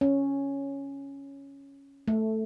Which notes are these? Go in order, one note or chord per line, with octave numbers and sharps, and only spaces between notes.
C#4
A3